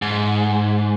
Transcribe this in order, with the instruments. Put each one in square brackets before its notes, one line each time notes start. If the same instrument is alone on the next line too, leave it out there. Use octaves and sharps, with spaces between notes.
[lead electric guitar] G#2